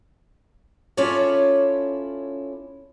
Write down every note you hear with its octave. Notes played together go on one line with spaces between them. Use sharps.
C#4 E4 F4 A4 C#5 D5